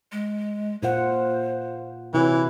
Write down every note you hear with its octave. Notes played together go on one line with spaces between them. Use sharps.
G#3
A#2 F4 C5 F#5
C3 E3 E4 F#4 C#5